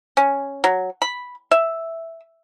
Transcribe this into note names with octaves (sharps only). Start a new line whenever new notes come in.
C#4
F#3
B5
E5